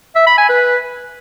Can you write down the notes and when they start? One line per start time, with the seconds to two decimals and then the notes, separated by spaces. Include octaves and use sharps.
0.15 E5
0.27 B5
0.38 G#5
0.49 B4